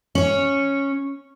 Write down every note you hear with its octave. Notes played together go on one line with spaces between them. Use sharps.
C#4 C#5